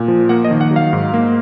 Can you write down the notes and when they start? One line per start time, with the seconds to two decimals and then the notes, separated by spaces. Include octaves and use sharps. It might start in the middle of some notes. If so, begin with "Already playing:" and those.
Already playing: A#2
0.08 F3
0.29 A#3 F#5
0.44 D#5
0.51 D#3
0.61 F#5
0.71 F#3
0.76 F5
0.93 G#2
1.13 A#3